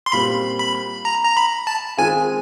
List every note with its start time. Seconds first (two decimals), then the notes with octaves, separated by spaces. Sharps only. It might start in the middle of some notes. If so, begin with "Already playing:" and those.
0.06 C6
0.12 A#2 G3 C4 B5
0.59 B5
1.05 A#5
1.25 A#5
1.37 B5
1.67 A5
1.97 D#3 G#3 C4 F4 G#5